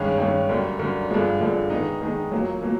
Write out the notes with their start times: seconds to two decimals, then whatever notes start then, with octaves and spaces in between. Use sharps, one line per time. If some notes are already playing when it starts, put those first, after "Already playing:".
Already playing: G2 D#3 G#3 C#4
0.18 G2 D#3 G#3 C#4
0.49 F#2 D3 G3
0.79 F#2 D3 G3
1.10 G2 D3 F3 G#3
1.41 G2 D3 F3 G#3
1.70 D#3 G#3 B3 D#4
2.01 D#3 G#3 B3 D#4
2.32 A#2 F#3 A#3
2.62 A#2 F#3 A#3